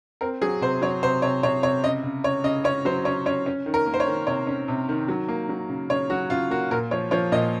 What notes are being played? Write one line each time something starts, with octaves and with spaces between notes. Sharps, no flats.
C4 A#4
F#3 G#4
C3 C5
F#3 C#5
C3 C5
C3 C#5
C3 C#5
C3 C#5
C#3 D#5
C#3
C#3 C#5
C#3 D#5
C#4 C#5
F#3 C5
C#4 C#5
C#4 C#5
C#4
D#3
A#4
A#3
C5
C#5
D#3
C3 C#5
C#4
C3
D#3
F#3
A#3
F#3
C#3
C#3 C#5
F#3 F#4
C#3 F4
A#3 F#4
A#2 A#4
F3 C#5
F3 C#5
A#2 D#5